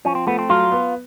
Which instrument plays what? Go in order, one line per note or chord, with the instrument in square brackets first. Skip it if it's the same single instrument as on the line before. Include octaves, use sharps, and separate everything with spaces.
[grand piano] F3 [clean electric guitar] C#4
[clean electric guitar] C4
[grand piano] A3 [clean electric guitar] B3
[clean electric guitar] C4
[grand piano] F#3 [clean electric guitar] F4
[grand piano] B3